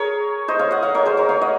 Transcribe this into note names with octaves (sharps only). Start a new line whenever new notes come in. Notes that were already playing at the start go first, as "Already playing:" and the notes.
Already playing: G#4 A#4 C#5
C5 D#5
C#5 F5
D#5 F#5
C#5 F5
A#4 C#5
G#4 C5
A#4 C#5
C#5 F5
D#5 F#5